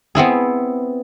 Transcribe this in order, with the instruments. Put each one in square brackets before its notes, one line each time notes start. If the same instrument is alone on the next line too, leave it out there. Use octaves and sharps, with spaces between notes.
[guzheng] B3 C4 E4 G#4